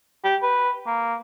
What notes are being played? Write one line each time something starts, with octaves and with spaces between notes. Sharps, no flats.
G4
B4
A#3